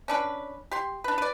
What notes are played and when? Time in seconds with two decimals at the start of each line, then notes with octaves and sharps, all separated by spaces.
0.08 C#4 D4 B4
0.71 G4 C6
1.04 D4 B4
1.18 B4 D5